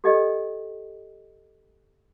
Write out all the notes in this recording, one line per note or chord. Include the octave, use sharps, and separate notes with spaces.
G4 A4 D5 D#5 G5